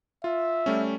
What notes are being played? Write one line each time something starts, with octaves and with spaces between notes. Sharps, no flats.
F4 E5
G3 A3 C#4